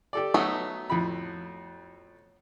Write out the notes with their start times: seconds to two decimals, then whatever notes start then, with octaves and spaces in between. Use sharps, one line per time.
0.13 G4 A4 D5
0.34 F#3 A3 B3 D#4
0.90 F2 A2 B5